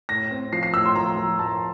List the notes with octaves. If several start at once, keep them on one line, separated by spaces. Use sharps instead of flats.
A2 A#6
C4
F3 C7
C7
A2 E6
C6
F3 A#5
F3
A2 A5